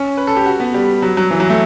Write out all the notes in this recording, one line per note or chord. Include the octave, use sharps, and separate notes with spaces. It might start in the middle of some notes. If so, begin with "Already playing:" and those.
Already playing: C#4
B4
A4
G4
F#4
B3
G3
F#3
F#3
E3
F#3
A3